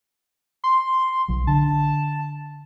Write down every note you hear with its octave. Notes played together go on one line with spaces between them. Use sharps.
C6
B1 F#3
D3 A5